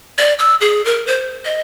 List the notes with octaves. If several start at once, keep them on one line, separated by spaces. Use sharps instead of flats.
D5
E6
G#4
A#4
C5
D#5